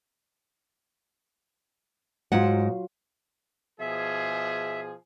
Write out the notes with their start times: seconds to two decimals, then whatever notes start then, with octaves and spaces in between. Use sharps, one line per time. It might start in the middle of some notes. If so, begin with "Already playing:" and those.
2.32 G#2 F#3 F4 F#5
3.80 B2 F3 G#4 E5